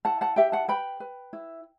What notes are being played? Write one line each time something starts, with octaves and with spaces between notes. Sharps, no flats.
E4 F#5 A5
F#5 A5
G4 E5 G5
F#5 A5
B4 G5 B5
B4
E4